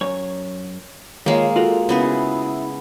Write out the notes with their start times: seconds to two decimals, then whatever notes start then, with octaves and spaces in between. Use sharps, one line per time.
0.01 F#2 C#5
1.26 D#3 G#3 A#3 F4 C#5 F5
1.56 F4 F#4 A4 A#4
1.89 C#3 B3 E4 G#4